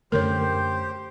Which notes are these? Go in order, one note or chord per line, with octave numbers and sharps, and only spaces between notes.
F#2 D3 A3 G4 A#4 C5 C#5